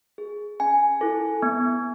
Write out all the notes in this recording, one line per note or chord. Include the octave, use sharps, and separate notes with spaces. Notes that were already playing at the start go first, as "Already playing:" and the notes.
G#4
C#4 G#5
E4 A4
B3